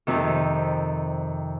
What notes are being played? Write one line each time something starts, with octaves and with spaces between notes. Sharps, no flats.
F2 C3 D#3